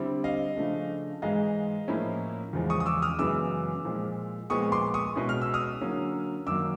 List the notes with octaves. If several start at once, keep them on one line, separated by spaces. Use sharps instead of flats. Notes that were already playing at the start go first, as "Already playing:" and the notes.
Already playing: D3 G3 C4 E4
D#5 F5
C#3 F3 A3 D4
G#2 E3 G#3 D#5 F5
A2 F3 A#3 C#4 E4
E2 C#3 F3 G#3
C#6 D#6
D#6
D6 E6
D#6 F6
F#2 C#3 E3 G#3 B3 D6 E6
A#2 F3 G#3
A#2 F3 G#3 B3 C#6 D#6
C6 D6
C#6 D#6
B2 G#3 C#4 E4
F6
E6
D#6 F6
D3 F#3 A#3 C#4
F#2 D#3 F#3 A#3 D6 E6